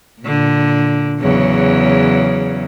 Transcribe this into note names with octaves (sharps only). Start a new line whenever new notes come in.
A#2 D3
E2 C#3 F#3